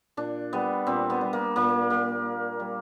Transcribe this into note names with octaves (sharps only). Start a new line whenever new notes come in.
A#2 D4
G3 B3
A#2 C4
B3
G3
A#3
A#2 A#3
G3 A#3
A#2
G3